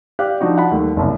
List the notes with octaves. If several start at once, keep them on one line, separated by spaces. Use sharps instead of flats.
G4 D5 F5 F#6
F3 D4 D#4 F#4
F#5 A5 B5
D#2 G3 A3
F#1 C2